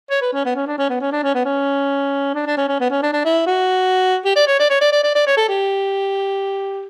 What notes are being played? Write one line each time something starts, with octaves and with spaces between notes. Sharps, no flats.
C#5
B4
C#4
B3
C#4
D4
C#4
B3
C#4
D4
C#4
B3
C#4
D4
D4
C#4
C#4
B3
C#4
D4
D4
E4
F#4
G4
D5
C#5
D5
C#5
D5
D5
D5
D5
C#5
A4
G4